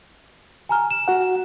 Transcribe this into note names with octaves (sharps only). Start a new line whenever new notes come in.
G#5 A#5 F6
E7
F#4 F#5